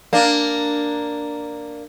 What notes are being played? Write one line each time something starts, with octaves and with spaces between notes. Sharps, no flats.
A#3 D4